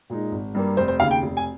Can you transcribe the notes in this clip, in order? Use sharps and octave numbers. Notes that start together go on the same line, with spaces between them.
A#2 G#3 D#4
G#1
G2 G3 A#3
F1 C5
C5
D#2 C#3 F5
G5
F1
G#5